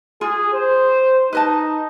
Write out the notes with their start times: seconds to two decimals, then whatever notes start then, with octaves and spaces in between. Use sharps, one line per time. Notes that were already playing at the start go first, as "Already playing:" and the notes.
0.21 F4 G#4
0.54 C5
1.33 D#4 B4 D#5 A5